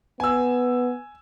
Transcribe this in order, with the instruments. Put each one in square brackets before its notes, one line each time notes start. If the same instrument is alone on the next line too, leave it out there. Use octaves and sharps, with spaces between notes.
[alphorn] B3 [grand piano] G#5 E6